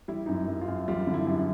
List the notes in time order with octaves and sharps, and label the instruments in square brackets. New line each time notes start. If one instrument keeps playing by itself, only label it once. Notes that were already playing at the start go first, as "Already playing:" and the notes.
[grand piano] G3 E4
F#2 D#4
E4
F#2
F4
F#2
G3 F4
D3
E4
F#2